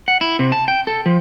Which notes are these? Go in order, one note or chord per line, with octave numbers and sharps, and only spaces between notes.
F#5
E4
C3
A5
G5
A4
F3